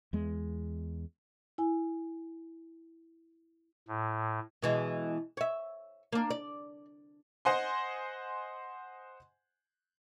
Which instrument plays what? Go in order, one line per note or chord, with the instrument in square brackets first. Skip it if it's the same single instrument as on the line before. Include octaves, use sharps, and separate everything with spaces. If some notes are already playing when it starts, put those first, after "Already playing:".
[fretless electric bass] E2 G#3
[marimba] E4 G#5
[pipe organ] A2
[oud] B2 E3 G#3
C#5 E5
A#3 D4
D5
[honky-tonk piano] C5 D#5 F#5 G#5 C6